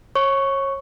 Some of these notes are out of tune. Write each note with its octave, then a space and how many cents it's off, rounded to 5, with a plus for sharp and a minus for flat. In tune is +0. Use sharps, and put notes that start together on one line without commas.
C#5 -30 C#6 +0